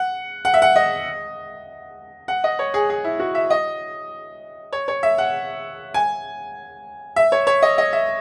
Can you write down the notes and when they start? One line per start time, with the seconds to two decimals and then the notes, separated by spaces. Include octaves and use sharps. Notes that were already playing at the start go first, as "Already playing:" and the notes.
Already playing: F#5
0.45 F#5
0.54 E5
0.62 F#5
0.76 D#5
2.28 F#5
2.44 D#5
2.59 C#5
2.74 G#4
2.90 G#4
3.04 E4
3.20 F#4
3.35 E5
3.50 D#5
4.73 C#5
4.88 C#5
5.03 E5
5.18 F#5
5.94 G#5
7.16 E5
7.32 C#5
7.47 C#5
7.62 D#5
7.78 D#5
7.93 E5